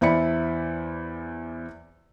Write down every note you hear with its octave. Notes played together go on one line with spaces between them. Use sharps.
E2 E4 C5 D5 B5 C#7